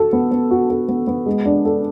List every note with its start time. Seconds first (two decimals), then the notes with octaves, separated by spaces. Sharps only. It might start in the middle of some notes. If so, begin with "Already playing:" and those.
Already playing: F#4 A4
0.13 B3
0.31 B3
0.51 F#4
0.70 A4
0.88 B3
1.07 B3
1.26 G#3
1.45 D4
1.65 A4